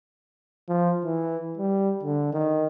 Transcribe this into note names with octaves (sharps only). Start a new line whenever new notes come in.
F3
E3
G3
D3
D#3